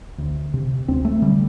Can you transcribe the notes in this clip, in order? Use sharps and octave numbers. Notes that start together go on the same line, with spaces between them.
D2
C3
D2 C4
A3
D3 G3